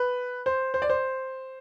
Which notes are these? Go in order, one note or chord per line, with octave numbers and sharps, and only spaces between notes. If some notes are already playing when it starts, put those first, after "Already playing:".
Already playing: B4
C5
C5
D5
C5